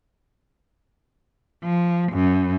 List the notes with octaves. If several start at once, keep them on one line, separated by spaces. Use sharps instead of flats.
F3
F#2